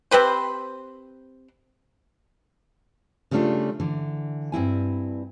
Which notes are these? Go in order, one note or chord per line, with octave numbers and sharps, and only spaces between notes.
C4 G4 B4 C5
C#3 G3 A3 C#4 D4 F4
D3 E3
G2 C4 E4 G#5